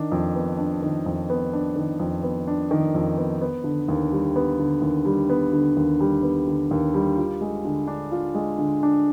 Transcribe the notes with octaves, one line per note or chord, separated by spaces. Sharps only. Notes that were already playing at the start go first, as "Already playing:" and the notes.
Already playing: D#3 D4
F2
B3
D4
D#3
F2
B3
D4
D#3
F2
B3
D4
D#3
F2
B3
B3
D3
D#2
G3
B3
D3
D#2
G3
B3
D3
D#2
G3
B3
D3
D#2
G3
F4
G#3
D3
D4
F4
G#3
D3
D4